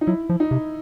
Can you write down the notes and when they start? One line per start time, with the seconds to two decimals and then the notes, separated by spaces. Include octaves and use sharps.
0.01 D#4
0.07 F#3 E4
0.30 F3
0.40 D#4
0.51 C3